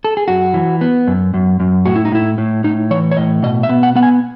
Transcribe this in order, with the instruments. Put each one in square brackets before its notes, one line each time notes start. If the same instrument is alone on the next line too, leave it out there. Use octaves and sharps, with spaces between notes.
[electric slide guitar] A4
G#4
F#2 F#4
E3
B3
F#2
F#2
F#2
A2 F#4
E4
D#4
A2 E4
A2
A2 D#4
E3 C#5
C#5
A2 D#5
B2 D#5
E5
B3
F#5
B3 F#5
G#5